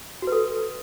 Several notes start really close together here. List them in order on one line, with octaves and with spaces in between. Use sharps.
F#4 B4 A4